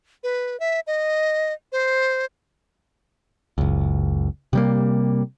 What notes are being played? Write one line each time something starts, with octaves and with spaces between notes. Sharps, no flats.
B4
E5
D#5
C5
F#1 C#2
C3 G3 A#3